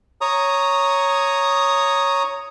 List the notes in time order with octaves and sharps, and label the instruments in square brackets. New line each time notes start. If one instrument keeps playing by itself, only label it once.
[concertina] C#5 A#5 D#6